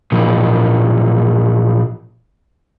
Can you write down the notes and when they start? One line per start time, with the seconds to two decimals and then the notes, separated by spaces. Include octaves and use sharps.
0.12 A#2 E3 F3